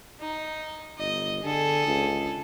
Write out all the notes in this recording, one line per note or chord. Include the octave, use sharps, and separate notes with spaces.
D#4
G1 D#5
D3 G#4 A4
C#2